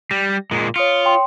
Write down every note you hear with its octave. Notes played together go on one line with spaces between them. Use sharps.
G3 A#6
A#2 G#3
F4 C#5 D#6 C#7
G5 C6